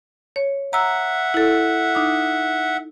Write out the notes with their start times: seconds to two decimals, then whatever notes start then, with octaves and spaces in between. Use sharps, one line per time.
0.36 C#5
0.73 E5 F#5 A#5 E6
1.34 E4 A4
1.95 D#4 D6